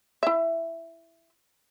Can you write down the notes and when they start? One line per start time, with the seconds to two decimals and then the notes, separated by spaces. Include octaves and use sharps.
0.23 E4 E5